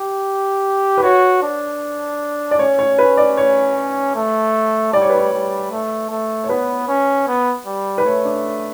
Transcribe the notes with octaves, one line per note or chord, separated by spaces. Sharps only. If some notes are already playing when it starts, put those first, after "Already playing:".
Already playing: G4
B4
F#4 C#5
D4
D5
C#4 C#5
C#5
B4
D5
C#5
A3
G3 D5
C#5
B4
C#5
G3
A3
A3
C#5
B3 B4
C#4
B3
G3
B4
A3 C#5
D4